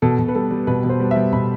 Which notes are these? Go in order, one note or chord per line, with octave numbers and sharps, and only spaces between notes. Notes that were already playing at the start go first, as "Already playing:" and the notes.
B2 A4
B2
B4
G3 A4
G3
B2 B4
B2
C5
G3
G3 E5
B2 B5